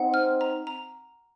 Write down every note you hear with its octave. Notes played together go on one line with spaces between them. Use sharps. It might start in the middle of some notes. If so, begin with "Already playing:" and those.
Already playing: C4 D#4 F#5
F6
A#5
A#5